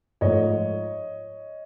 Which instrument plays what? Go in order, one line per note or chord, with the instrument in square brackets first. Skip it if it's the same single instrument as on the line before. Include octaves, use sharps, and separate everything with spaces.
[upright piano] G#2 F3 A3 C#5 D#5